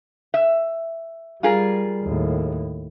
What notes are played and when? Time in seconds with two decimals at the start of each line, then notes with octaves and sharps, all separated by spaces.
0.34 E5
1.43 G3 F4 G#4 A#4
2.02 D#2 A2